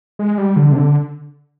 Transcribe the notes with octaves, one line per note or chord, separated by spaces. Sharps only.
G#3
G3
D3
C3
D3